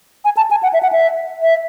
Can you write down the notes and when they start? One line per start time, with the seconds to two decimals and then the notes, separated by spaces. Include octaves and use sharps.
0.25 G#5
0.37 A5
0.51 G#5
0.63 F#5
0.73 E5
0.83 F#5
0.92 E5
1.42 E5